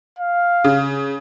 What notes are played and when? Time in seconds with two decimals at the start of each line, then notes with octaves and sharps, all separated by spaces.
0.19 F5
0.64 C#3